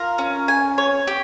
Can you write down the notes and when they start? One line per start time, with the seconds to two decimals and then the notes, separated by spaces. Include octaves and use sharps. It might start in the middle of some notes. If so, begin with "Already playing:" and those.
Already playing: F4 A#4
0.18 C#4
0.48 G#5
0.78 C#5
1.07 G4